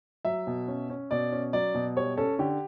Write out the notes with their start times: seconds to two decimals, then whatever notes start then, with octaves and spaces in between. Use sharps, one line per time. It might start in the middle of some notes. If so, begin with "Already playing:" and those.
0.25 F#3 E5
0.47 B2
0.68 C#4
0.90 C#4
1.11 B2 D5
1.32 C#4
1.53 F#3 D5
1.75 B2
1.97 G3 C#5
2.17 C#4 A4
2.39 D3 G4